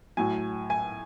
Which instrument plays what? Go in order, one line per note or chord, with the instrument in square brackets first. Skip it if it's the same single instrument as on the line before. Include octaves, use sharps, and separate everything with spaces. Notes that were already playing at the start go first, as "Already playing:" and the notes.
[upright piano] A2 F#3 G#5
G#5